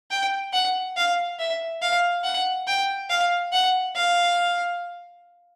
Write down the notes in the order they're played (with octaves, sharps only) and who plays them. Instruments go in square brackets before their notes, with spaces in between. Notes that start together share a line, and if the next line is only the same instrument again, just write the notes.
[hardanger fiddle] G5
F#5
F5
E5
F5
F#5
G5
F5
F#5
F5